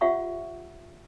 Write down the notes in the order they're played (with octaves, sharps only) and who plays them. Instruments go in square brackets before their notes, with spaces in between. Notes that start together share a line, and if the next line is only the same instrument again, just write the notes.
[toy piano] F4 G4 C#5 E5 F#5 C#6